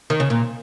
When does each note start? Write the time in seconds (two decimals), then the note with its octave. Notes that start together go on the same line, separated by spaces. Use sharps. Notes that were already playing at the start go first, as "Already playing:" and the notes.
0.10 D#3
0.20 C#3
0.30 A#2